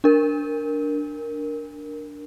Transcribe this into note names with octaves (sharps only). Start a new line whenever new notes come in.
D4 A#4